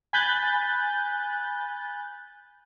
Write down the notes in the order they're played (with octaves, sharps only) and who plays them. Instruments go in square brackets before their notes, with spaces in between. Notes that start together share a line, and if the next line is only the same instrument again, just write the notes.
[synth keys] G#5 B5 F#6 G6 A6